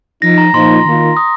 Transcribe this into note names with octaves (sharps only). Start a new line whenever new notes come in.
F3 D#4 A#6
A#5
A#2 F3 D#4 C6
D#3 A#3 F4
D#6